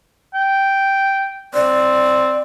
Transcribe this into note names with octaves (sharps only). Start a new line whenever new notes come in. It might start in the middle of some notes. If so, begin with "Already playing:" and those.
G5
C4 D5